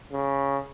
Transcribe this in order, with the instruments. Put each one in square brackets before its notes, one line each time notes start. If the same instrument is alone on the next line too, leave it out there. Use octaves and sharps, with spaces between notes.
[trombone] C#3